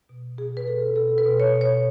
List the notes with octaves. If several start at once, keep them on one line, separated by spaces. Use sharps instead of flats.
B2
B2 G#4
B4
B2 A4
B2 A4
B4
B2
C#5
B2
C#5